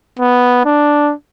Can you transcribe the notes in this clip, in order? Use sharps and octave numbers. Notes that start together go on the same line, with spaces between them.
B3
D4